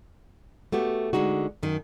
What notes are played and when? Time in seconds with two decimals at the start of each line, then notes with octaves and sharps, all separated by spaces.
0.72 A3 B3 F#4 G4
1.13 D3 G#3 D#4 F#4
1.63 F#2 D#3